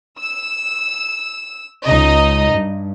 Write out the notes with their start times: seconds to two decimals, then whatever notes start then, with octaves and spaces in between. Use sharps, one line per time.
0.20 E6
1.85 C#2 D#4 D#5
2.52 G2